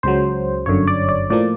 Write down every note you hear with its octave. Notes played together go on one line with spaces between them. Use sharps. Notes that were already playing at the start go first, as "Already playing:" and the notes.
C#2 C#3 F#3 C5
G1 F#2 D3 C#5
D5
D5
A2 F3 A#3 D5